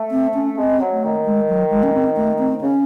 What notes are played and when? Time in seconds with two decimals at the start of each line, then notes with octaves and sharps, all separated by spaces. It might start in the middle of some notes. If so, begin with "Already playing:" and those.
Already playing: A3
0.11 C4
0.34 C#4
0.57 G#3 C4
0.79 F#3
0.91 A3
1.03 D#3
1.25 G#3
1.48 F#3
1.71 G#3
1.83 C#4
1.94 C4
2.17 A3
2.39 C4
2.61 C#3 C#4